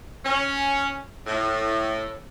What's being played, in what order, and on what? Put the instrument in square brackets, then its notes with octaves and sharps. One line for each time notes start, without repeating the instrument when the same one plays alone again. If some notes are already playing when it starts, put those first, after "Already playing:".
[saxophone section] C#4
A2